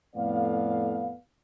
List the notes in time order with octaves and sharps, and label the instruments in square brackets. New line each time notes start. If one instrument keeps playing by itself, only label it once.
[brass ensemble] F2 A2 B3 A4 D5 F5